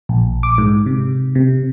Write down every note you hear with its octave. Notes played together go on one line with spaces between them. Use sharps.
A#1
D6
G#2
C3
C3